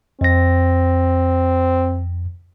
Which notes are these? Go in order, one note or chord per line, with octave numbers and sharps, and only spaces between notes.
F2 C4 A#6